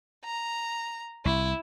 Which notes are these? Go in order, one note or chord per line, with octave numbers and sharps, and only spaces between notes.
A#5
C2 E4